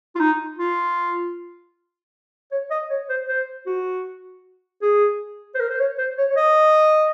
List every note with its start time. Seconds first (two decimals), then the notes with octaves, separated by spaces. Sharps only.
0.15 F4
0.20 D#4
0.59 F4
2.51 C#5
2.71 D#5
2.90 C#5
3.09 C5
3.28 C5
3.66 F#4
4.82 G#4
5.55 C5
5.60 A#4
5.70 C5
5.79 C#5
5.98 C5
6.18 C#5
6.30 C#5
6.36 D#5